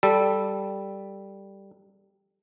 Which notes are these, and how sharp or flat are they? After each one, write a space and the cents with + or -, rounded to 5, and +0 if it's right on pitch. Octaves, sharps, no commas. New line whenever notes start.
G3 +0 A4 +0